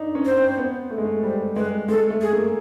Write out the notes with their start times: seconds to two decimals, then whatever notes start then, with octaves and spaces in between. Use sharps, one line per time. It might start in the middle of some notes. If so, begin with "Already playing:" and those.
Already playing: D4 D#4
0.15 C#4
0.26 C5
0.37 C4
0.58 B3
0.91 A3
0.98 G#3
1.05 A3
1.23 G3 C5
1.56 G#3 B4
1.88 G#3 A4
2.10 A3
2.21 G#4
2.33 A#3